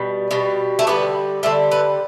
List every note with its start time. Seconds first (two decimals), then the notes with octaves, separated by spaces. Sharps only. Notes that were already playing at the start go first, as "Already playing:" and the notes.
Already playing: B2 G3
0.31 B2 G3
0.79 A3
0.87 D3 G3 B3
1.43 D3 G3 A3
1.72 B3